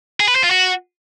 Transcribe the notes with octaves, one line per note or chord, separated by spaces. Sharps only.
G#4
B4
C5
F4
F#4